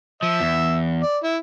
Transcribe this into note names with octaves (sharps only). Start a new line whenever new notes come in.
F3 E5
E2
D5
E4